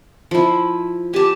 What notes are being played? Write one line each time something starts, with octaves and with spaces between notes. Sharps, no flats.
F3 E4
G4 G#5 A5